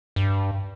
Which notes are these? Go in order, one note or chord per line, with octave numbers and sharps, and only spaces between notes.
G2